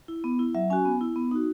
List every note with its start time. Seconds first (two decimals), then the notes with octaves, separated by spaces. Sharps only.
0.08 E4
0.24 B3
0.39 E4
0.55 F#3 E5
0.70 C#4 F#4 G#5
0.85 B3
1.01 E4
1.16 B3
1.31 D#4 F#4